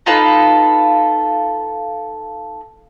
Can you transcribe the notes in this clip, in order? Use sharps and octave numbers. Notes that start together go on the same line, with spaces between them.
D#4 F4 A4 B4